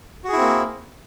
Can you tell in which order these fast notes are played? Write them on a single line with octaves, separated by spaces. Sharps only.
F#4 G#4 E4 C4 A#3